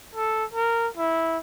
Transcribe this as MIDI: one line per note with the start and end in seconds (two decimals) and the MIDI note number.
0.15 0.45 69
0.53 0.87 70
0.97 1.38 64